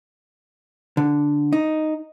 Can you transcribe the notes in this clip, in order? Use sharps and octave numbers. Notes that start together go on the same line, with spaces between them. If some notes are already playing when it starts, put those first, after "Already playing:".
D3
D#4